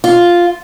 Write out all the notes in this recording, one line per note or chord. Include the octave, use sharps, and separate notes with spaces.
F4